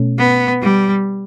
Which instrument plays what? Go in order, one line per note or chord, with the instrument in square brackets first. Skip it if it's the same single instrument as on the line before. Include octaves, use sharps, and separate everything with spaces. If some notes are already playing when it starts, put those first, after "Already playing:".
Already playing: [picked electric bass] B2 A3 C#4
[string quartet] B3
G3